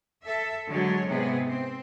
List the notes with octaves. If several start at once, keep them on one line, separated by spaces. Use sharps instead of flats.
A4 E5
D3 F#3 G#3 C#5
G#2 C3 B3 G#4
C4